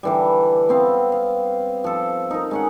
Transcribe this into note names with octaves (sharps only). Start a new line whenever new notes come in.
D3 E3 G3
B3 C4 F5
F5
F3 A4
D#4 A#4
G#3 C#4 F#5